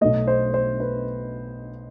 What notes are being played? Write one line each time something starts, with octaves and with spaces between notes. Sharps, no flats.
B1 B2 A3 D#5
C5
C5
B4